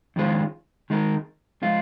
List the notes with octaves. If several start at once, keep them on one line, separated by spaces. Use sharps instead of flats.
F2 D#3 G#3 F4 C5
D#3 G#3 D#4 A#4
F3 G#3 F4